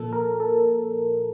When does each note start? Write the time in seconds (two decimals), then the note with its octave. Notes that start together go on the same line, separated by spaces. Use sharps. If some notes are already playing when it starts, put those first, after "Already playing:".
Already playing: A#2 F3 A#3 A4
0.13 A#4
0.40 A4